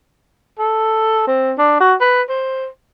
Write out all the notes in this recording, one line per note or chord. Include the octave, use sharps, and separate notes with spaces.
A4
C4
D4
F#4
B4
C5